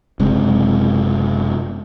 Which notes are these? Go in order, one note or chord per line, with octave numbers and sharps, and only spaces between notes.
F#1 C3 G#3